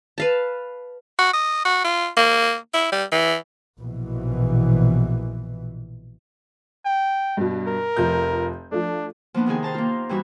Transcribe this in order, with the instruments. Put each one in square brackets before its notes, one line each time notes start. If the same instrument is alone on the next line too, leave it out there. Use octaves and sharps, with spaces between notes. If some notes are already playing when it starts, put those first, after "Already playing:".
[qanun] B4 F5 A5
[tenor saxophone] F#4
D#5
F#4
F4
A#3
E4
G3
E3
[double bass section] A#1 B2 E3
[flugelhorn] G5
[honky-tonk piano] G2 B2
[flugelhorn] A#4
[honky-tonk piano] F1 F3 G6
[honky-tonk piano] F3 A3 [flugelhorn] D4
[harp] F3 A#3 B3 D4
C3 D#3 D#4 G#4
C5 A5 A#5
A#3 F4
G2 E3 G3 F#4 E5